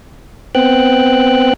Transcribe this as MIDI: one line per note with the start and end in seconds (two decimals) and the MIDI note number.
0.55 1.54 59
0.55 1.54 60
0.55 1.54 79
0.55 1.54 90